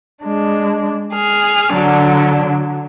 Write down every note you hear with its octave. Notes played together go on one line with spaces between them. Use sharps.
G#3 D4
G#4 F6
D3 F#3 D4